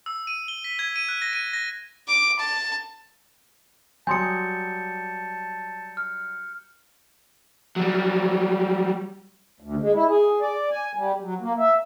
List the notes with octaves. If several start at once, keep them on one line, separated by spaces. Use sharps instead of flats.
E6
D#7
G7
B6
G#6
D#7
F#6
A#6
D#7
A#6
D6
A5
F#3 G3 G#5 A5 C6 D#6 G6 C#7
F6
F#3 G3
D2
G#3
E4
G#4
D5
G#5
G3
F#3
A#3
E5